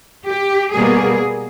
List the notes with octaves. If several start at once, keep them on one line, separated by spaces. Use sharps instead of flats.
G4
B2 G3 A#3 G#4